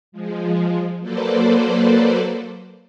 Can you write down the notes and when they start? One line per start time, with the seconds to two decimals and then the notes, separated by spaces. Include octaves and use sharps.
0.12 F3 G#3
1.00 F#3 A#3 A4 B4 C5 D5